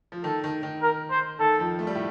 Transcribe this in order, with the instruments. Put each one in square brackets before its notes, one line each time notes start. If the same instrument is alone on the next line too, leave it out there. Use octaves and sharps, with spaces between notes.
[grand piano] F3
[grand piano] D#3 [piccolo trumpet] A4
[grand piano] D#3
D#3
[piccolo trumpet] A#4
C5
[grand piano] D#3 [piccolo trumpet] A4
[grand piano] F2 F3
A3
G3
A2 A3